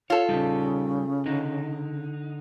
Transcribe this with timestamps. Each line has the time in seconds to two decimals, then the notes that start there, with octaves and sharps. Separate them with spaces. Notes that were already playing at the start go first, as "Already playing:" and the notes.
0.10 F4 A4 C#5
0.29 C#3 G3 D#4 G4
1.26 D3 D#4